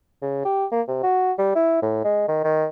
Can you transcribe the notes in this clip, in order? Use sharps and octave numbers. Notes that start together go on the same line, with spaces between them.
C#3
G4
A#3
C3
F#4
G3
E4
A2
G#3
D#3
D#3